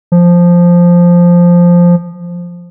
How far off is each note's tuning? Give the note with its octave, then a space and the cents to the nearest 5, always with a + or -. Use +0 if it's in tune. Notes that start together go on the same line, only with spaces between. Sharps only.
F3 +0